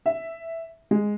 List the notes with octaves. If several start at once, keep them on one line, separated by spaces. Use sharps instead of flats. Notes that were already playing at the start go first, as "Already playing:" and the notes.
E5
G#3